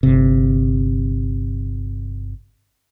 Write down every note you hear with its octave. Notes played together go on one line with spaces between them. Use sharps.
G1 C3